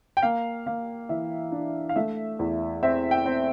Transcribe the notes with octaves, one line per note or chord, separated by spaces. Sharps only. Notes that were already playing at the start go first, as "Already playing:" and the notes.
G5
A#3 F5
A#3 F5
E3 E5
D4
F5
A3 E5
E2
C4 E5
G5
C4